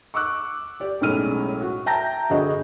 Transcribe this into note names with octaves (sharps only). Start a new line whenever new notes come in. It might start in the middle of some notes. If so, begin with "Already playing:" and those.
C#6 D6 E6 F#6
G4 D5
B1 F#2 A2 G#3 F6 D#7
F#4
E5 G5 A5 A#5 G6 A#6
G1 D4 F#4 G#4 D#5